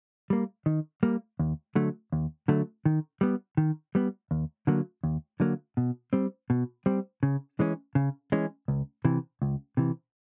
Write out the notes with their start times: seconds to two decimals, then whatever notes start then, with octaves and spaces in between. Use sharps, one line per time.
0.30 G3 A#3
0.66 D#3
1.03 G3 A#3
1.39 D#2
1.75 D3 F#3 A3
2.12 D#2
2.48 D3 F#3 A3
2.85 D#3
3.21 G3 B3
3.57 D#3
3.95 G3 B3
4.31 D#2
4.67 D3 F#3 A#3
5.03 D#2
5.40 D3 F#3 A#3
5.77 B2
6.13 G3 C4
6.50 B2
6.86 G3 C4
7.23 C#3
7.60 E3 G#3 C#4
7.95 C#3
8.32 E3 G#3 C#4
8.68 C#2
9.05 C3 E3
9.42 C#2
9.77 C3 E3